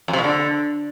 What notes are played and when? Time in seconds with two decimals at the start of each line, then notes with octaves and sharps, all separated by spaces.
0.08 F2
0.13 C3
0.19 A#2
0.24 D3